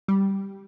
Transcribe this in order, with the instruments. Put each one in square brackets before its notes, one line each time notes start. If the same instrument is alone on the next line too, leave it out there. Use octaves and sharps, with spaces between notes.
[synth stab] G3